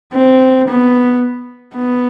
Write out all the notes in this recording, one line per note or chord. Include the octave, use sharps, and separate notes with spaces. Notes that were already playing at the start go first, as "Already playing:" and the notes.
C4
B3
B3